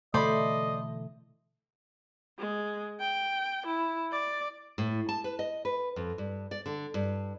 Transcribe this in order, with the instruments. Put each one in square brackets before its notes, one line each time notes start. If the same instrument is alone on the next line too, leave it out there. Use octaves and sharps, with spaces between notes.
[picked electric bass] B2 D3 E3 [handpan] A3 [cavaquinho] C5 D5 B5 [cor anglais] D#5
[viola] G#3
G5
E4
D5
[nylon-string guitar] A2
A5
B4
D#5
B4
F2
G2
D5
D3
G2